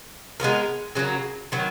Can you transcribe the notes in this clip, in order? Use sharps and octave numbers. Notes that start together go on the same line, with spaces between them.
G#3 B3 F#4 A#4
C#3 F#3 A#3
D#3 F#3 B3